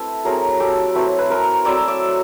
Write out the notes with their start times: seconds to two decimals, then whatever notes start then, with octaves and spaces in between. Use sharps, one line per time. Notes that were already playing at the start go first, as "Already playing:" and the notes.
Already playing: A3 C4 E4 A4 B4
0.25 F#3 A3 C4 E4 G#4 A#4
0.60 G4 A4
0.95 F#3 A3 C4 E4 B4 C#5
1.18 B4
1.30 A#4 C5
1.65 F#3 A3 C4 E4 D5 E5
1.88 D5 E5